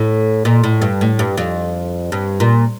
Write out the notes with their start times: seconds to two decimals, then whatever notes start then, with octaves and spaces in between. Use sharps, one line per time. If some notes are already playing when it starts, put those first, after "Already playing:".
Already playing: A2
0.45 A#2
0.64 A2
0.82 G2
1.01 A2
1.19 G2
1.37 F2
2.12 G2
2.40 A#2